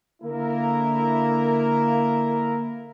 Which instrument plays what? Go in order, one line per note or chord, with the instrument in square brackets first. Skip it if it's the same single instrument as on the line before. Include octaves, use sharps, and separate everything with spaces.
[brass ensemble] D3 A#3 E4 A#4